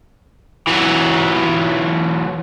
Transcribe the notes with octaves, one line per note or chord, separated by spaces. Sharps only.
E3 F#3